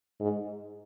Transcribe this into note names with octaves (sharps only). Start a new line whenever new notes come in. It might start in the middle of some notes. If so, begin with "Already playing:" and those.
G#2